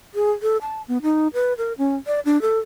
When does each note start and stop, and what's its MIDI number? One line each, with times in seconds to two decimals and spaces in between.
0.15 0.31 68
0.42 0.57 69
0.61 0.82 81
0.88 0.98 59
1.02 1.28 63
1.34 1.53 71
1.58 1.73 70
1.78 1.96 61
2.07 2.20 74
2.25 2.40 62
2.42 2.59 69